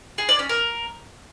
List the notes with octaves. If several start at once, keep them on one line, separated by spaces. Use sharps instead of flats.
G#4
D5
C#4
A#4